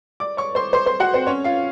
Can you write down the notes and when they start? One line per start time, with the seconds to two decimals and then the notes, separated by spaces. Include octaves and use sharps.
0.20 D5 D6
0.37 C#5 C#6
0.55 C5 C6
0.73 C5 C6
0.86 C5 C6
1.00 F#4 F#5
1.13 C4 C5
1.27 C#4 C#5
1.44 F4 F5